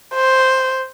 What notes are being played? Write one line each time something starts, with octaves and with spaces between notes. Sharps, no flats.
C5